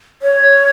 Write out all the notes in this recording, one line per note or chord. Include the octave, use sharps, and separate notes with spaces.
C#5